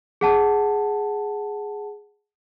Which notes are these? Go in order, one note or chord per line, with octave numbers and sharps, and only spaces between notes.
G#4 F#5 A5